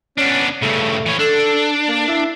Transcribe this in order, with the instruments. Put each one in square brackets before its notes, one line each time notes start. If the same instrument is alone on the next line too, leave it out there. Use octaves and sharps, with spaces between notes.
[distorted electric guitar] B3 D4 [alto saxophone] C#4
[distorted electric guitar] G2 C#3 [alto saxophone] A3
[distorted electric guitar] E3 C#5
[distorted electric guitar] D4 [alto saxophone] A4
[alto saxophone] A#3
E4